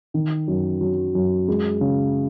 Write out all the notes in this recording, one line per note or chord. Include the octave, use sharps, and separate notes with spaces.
D#3
F#2
F#3
F#2
G#3
C#3